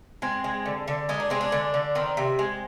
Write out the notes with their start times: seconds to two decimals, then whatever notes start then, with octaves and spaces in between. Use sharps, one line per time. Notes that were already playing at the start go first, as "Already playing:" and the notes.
0.22 G#3 C4
0.44 G#3
0.66 D3
0.88 D3
1.09 G#3 D#4
1.20 D4
1.30 G#3 C4
1.41 D4
1.52 D3
1.74 D3
1.95 D#3 C4
2.17 C3
2.39 G#3